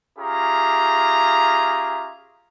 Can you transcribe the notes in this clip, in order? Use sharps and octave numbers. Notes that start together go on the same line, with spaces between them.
C#4 F4 G4 G#4 E5 A#5